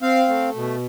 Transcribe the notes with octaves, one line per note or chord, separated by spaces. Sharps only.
C4 F5
A3
B2